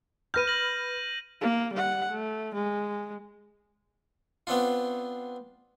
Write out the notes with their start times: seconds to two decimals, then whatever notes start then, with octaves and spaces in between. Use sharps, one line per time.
0.34 B4 F6 G6 A#6 D#7
0.47 A#6 F#7
1.41 A#3
1.73 G3 F#5
2.11 A3
2.55 G#3
4.47 B3 C4 D4 F4